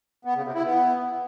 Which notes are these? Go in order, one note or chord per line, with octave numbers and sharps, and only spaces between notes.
B3
C#3
C3
E4
B3